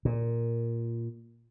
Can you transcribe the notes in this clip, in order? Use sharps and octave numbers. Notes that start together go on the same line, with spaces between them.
A#2